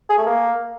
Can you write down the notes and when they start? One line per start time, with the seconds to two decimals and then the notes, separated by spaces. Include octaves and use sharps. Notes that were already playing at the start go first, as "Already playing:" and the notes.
0.10 G#4
0.18 A3
0.26 A#3